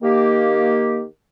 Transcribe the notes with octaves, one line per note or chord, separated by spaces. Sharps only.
D#3 A#3 G4